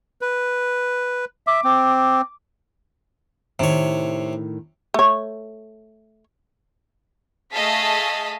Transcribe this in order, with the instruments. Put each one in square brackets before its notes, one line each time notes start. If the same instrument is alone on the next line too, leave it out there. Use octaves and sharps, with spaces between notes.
[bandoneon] B4
[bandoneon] E5 [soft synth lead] D6
[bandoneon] C4
[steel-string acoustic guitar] A2 D#3 [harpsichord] C3 C#5
[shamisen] A3 C#5
[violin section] A3 G#4 D#5 F5 A5 B6